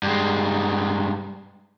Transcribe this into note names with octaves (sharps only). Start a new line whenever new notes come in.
G2 G#3